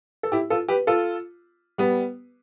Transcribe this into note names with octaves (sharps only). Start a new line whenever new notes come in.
A4
E4 G4
F4 A4
G4 B4
F4 A4
G3 B3